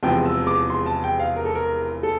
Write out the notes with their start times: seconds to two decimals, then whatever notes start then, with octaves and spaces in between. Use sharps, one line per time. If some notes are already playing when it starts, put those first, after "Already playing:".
0.03 E1 E2 C3 F3 G5
0.25 E6
0.47 D6
0.70 C6
0.86 A5
1.04 G5
1.19 F5
1.36 A#4
1.45 A4
1.55 A#4
2.03 A4